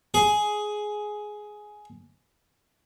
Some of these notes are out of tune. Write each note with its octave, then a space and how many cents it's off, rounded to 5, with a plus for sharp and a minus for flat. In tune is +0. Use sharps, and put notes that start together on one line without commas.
G#4 +10